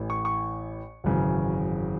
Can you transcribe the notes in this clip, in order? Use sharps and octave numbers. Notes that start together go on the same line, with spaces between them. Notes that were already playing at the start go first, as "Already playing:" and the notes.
Already playing: A1 A2 E3
C#6
C#6
G#1 F#2 C#3 E3